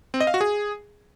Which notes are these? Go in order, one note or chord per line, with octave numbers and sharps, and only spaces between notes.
C4
D#5
F5
F#4
G#4